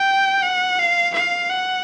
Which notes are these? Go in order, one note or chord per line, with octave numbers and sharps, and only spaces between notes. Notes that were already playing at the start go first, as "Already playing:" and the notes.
Already playing: G5
F#5
F5
F5
F#5